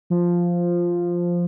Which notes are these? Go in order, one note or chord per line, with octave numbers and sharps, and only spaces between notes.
F3